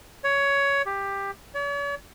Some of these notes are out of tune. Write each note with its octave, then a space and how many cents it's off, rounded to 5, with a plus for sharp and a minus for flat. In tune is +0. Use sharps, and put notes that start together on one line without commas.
C#5 +15
G4 +15
C#5 +45